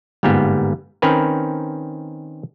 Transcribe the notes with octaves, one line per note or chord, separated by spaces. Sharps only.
G1 G#2 G3 A#3 B3
D#3 C4 C#4 A#4 B4